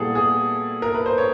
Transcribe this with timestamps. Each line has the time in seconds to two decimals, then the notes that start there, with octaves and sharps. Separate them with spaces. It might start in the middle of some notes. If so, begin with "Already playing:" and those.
Already playing: A#2 G3 B3 E4 G#4 A4
0.15 G#4
0.82 A#4
0.94 B4
1.06 C5
1.18 C#5